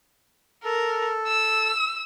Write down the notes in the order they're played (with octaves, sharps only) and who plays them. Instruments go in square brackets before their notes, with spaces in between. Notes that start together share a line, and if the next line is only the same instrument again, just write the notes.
[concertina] A4 [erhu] A#4
[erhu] E6